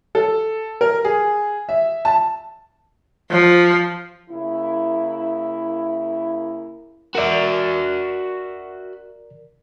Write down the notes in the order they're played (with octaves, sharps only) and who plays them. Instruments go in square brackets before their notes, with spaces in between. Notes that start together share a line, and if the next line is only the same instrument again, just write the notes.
[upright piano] A4
A#4
G#4
E5
A5
[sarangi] F3
[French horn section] C#3 A#3 E4
[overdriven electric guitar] F#4 E5 [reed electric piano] A#4 D5